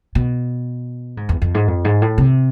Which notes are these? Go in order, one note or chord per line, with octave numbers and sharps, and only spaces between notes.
B2
G#2
E2
F2
G#2
F2
G#2
A2
C3